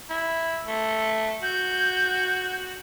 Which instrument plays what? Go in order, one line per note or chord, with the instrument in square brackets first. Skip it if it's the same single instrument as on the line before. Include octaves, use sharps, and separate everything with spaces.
[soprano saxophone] E4
A3
[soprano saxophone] F#4 [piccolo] G6